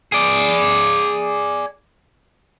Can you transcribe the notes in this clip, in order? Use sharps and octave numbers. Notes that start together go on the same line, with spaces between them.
G#4 D5